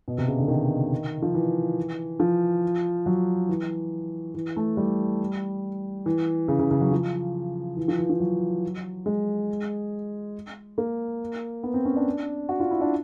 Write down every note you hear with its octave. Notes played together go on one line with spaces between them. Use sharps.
B2
C3
C#3
D3
D#3
F3
E3
F3
F#3
E3
E3
A3
G3
E3
C#3
C#3
C#3
F#3
F3
E3
F3
E3
F3
F#3
G#3
A#3
B3
C4
C#4
D4
F#4
F4
E4
D4